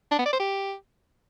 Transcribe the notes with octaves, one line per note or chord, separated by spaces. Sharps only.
D4
B3
D5
C5
G4